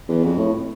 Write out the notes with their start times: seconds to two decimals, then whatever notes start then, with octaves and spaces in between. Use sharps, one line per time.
0.08 E2
0.23 F2
0.38 A2